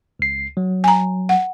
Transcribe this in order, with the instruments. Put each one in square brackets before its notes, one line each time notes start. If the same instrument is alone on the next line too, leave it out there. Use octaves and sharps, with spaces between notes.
[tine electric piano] C#2 C7
F#3
[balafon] G#5 A#5
F#5